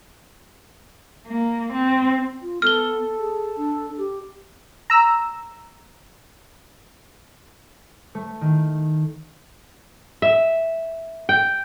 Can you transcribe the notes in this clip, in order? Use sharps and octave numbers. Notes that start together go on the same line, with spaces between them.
A#3
C4
F4
B3 A4 F6 G7
G#4
D4
G4
A#5 E6
A3
D#3
E5
G5